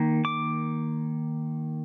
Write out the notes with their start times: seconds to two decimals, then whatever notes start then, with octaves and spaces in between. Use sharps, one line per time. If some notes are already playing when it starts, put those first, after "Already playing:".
Already playing: D#3 A#3
0.25 D6